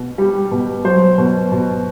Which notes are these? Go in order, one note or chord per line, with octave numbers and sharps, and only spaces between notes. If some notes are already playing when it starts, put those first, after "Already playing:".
Already playing: B2
G3
B2
F#3 C5
B2
B2